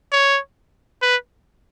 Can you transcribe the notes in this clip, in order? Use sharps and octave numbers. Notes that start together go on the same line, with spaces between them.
C#5
B4